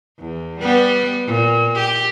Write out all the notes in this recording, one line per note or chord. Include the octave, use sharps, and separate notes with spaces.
E2
G3 B3
A#2
G4